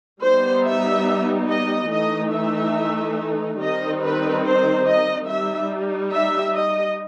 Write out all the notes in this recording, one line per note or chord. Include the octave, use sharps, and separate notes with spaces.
G3 B3 D#4 C5
E5
D#5
E3 A3 D#4 D#5
E5
D#3 G3 C4 D#4 D#5
B4
C5
D#5
G3 D#4 E5
E5
D#5